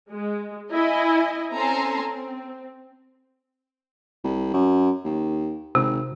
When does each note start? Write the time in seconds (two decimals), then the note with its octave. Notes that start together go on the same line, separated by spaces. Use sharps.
0.10 G#3
0.72 E4 D#5 G#5
1.52 C4 C#4 A4 G#5 A#5 C6
2.02 C4
4.24 C2
4.54 F#2
5.05 D#2
5.75 G#1 C3